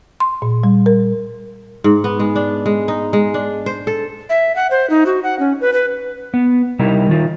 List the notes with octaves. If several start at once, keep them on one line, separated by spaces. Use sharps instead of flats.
C6
A#2
G3
A#4
G#2
B3
G#3
D4
G#3
D#4
G#3
D4
C5
A4
E5
F#5
C5
D#4
F#4
F#5
C#4
B4
B4
B3
C3 G3 D#4 E4 A#4
D#3 F4